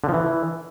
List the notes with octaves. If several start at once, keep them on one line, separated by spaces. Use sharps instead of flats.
D3
F3
E3